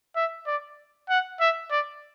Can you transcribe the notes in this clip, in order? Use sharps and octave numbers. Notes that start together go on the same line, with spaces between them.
E5
D5
F#5
E5
D5